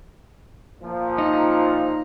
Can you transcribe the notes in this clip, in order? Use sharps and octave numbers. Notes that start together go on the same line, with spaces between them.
A#2 F3
D#4